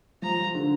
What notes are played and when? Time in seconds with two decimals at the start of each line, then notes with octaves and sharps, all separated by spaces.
0.22 F3 A#5
0.39 F3
0.55 D3